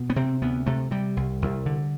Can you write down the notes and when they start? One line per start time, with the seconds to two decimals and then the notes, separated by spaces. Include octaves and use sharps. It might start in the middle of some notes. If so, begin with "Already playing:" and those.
Already playing: B2
0.10 B3
0.16 C3 C4
0.42 D2 B3
0.66 C3 A3
0.91 C3 G3
1.17 C2
1.42 C2
1.66 D3